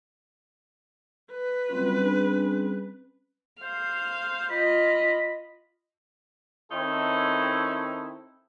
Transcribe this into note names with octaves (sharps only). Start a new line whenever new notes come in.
B4
F#1 G3 C4 C#4 F4
D4 G#4
C5 F5
F4 D#5 B5
D#3 C4 C#4 D#4 E4 A4